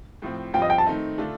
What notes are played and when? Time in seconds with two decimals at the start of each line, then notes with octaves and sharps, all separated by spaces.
0.22 A2 F3 C4
0.54 G2 F3 C4 F4 G5
0.62 D#5
0.70 G5
0.78 A5
0.86 D#3 A3 C4 D#4
1.18 D3 A3 D4 F4